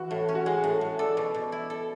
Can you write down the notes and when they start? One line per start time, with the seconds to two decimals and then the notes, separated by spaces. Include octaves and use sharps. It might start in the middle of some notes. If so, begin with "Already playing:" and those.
Already playing: E3 F#4
0.11 A2
0.29 C#4
0.35 F#4
0.46 G#3 G#4
0.64 A2
0.81 A2
0.99 A4 D5
1.17 B2
1.34 B2
1.52 E4
1.70 A4